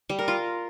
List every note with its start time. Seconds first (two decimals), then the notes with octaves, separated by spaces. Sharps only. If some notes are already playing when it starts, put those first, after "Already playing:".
0.09 G3
0.19 A#4
0.28 F4